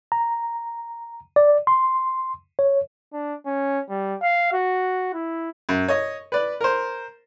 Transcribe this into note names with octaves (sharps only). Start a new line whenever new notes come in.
A#5
D5
C6
C#5
D4
C#4
G3
F5
F#4
E4
F#2
C#5 D#5
B4 D5
A#4 C5